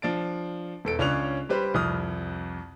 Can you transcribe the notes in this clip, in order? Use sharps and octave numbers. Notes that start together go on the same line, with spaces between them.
F3 D4 A6 D7
E1 A4 D7
C#2 C#4 D4 C#5 F#6 F7
G3 G4 B4 C5
C2 F2 D#6 F6